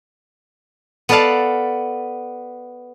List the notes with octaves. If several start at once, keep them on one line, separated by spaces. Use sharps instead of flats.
B3 A4 B4 D5 F5 A5